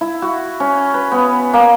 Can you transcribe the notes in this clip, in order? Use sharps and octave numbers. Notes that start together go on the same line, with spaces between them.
E4
F#4
C#4
B4
B3
A#3